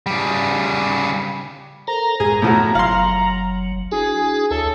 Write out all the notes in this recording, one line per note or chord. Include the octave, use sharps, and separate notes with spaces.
C#3 G3
A4 A#4 C5 A#5
F#2 A2 G#3 G#4
A2 C#3 F3 F#4
F#1 F#3 F5 C6
D4 E4 F#4 G#4
D2 A4 C#5 E5